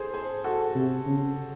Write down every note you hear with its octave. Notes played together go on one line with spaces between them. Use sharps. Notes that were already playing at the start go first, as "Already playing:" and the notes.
Already playing: G#4 A4 C5
G#4 C5
F#4 A4
C3
C#3